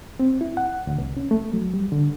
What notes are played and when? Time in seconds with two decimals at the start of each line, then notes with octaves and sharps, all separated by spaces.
0.20 C4
0.41 E4
0.57 F#5
0.87 D2
0.98 C2
1.17 C#4
1.31 A3
1.53 F#3
1.74 G3
1.92 D3